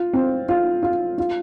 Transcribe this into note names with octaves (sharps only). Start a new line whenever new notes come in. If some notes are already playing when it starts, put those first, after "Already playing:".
Already playing: F4
C4
F4
F4
F4